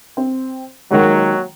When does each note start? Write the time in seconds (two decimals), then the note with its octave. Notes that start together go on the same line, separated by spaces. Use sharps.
0.17 C4
0.91 D#2 D#3 F#3 G#3